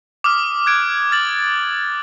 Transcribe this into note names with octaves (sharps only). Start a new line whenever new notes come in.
D6 D#6 F6
F#6 G#6 D7
F6 A6 F#7